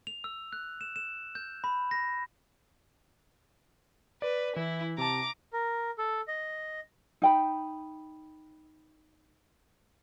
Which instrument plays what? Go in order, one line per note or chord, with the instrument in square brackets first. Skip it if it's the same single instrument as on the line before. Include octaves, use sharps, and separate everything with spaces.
[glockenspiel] F7
E6
F#6
E7
E7
G6
B5
A#6
[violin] B4 [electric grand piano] D5
[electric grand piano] E3 [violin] E4
[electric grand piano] C3 A5 [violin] A#5 D6
[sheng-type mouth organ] A#4
A4
D#5
[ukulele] D#4 G5 B5